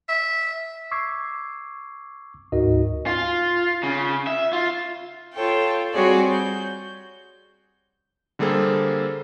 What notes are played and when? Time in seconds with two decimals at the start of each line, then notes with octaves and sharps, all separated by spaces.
0.09 E5
0.91 C#6 D6 E6 G#6 C7
2.52 D2 G#2 D#4 F#4 A#4 D#5
3.06 F4
3.83 C#3
4.27 E5
4.53 F4
5.34 F4 A4 C#5 G5
5.93 G3 C4 F#4 G#4 C#5 D5
6.31 G6
8.39 D3 G3 A#3 G#4 A4 C5